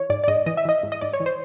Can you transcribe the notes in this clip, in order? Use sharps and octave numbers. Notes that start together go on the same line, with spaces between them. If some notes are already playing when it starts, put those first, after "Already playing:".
Already playing: E3 C#5
G#2 D5
D5
G#2 D#5
E3 D#5
E5
E3 D#5
G#2
D#5
G#2 D5
C#5
E3
C5